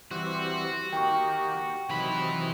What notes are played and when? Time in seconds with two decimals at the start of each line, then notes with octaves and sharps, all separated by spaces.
0.11 E3 G3 C4 F#4
0.93 D#3 A#3 G4 G5 C#6
1.89 C3 D#3 E3 F#3 B5